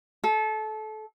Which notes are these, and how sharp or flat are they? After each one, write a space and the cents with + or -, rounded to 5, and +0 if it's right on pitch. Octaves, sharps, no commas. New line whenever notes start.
A4 -25